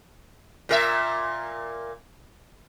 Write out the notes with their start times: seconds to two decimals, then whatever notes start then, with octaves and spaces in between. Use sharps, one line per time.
0.69 A#2 A#4 E5